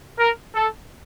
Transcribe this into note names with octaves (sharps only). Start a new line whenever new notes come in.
A#4
A4